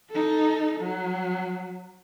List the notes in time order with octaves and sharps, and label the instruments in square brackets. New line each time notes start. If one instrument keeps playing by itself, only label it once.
[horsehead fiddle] D#4 A4
F#3